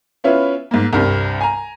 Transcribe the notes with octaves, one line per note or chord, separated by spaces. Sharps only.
B3 C#4 E4 F4 B4
G#2 A#3
C2 G2 C3
G#5 A#5